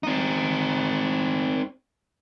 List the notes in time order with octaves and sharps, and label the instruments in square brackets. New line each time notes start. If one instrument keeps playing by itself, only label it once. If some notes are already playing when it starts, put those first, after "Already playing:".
[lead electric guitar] C4 D#4